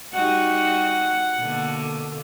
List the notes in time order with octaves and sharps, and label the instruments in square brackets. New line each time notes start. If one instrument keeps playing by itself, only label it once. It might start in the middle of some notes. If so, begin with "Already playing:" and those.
[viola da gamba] G3 D#4 F#4 [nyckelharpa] F#5
[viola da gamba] B2 D3 A#3